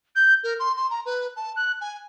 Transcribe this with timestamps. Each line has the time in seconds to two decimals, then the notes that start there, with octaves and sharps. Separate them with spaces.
0.15 G6
0.43 A#4
0.59 C6
0.76 C6
0.90 A#5
1.05 B4
1.36 A5
1.56 F#6
1.81 G#5